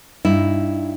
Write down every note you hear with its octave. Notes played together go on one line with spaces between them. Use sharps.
G2 D#4 E4